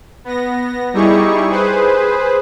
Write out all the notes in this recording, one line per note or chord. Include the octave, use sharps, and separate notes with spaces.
B3 A#6
G3 D#4 E4 G4 G#4 C#6
G#4 B4 C5